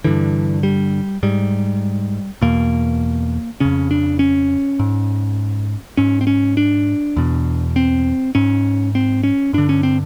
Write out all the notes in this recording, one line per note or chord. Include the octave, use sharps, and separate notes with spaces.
G2 D3 E3
G3
G#2 G3
E2 B2 A#3
F2 C#3 C#4
D4
C#4
G#2
G#2 C#4
C4
C#4
D4
E2 B2
C4
G#2 C#4
C4
C#4
G2 D3 D4
C#4
C4